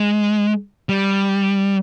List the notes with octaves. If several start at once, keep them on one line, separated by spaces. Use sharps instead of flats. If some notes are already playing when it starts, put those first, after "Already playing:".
Already playing: G#3
G3